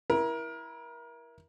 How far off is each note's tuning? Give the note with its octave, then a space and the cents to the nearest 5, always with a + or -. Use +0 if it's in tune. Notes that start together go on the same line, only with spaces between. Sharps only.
E4 +0 A#4 +30